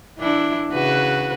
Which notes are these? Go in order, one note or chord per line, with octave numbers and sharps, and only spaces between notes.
E3 D4 E4
C#3 F#4 B4